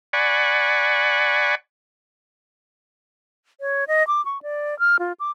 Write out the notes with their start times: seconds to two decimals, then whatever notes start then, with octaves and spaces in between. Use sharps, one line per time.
0.13 D5 F#5 G#5 B5 C#6
3.61 C#5
3.88 D#5
4.07 D6
4.25 C#6
4.42 D5
4.79 F6
4.99 F4
5.20 D6